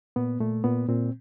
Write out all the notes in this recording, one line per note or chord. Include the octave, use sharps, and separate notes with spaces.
A#2 B3
A#2 A3
A#2 B3
A#2 C4